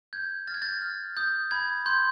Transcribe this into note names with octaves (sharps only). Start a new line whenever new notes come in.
G6 G#6
F6 A6
G#6
G6 A6
F6
D#6 G6
B5 G#6
C6 G6